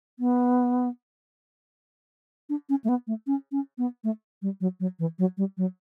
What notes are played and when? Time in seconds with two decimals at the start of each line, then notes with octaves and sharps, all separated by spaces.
0.19 B3
2.49 D4
2.69 C#4
2.84 A3
2.89 B3
3.07 A3
3.27 C#4
3.52 C#4
3.78 B3
4.04 A3
4.42 G3
4.61 F#3
4.80 F#3
4.99 E3
5.19 F#3
5.38 G3
5.57 F#3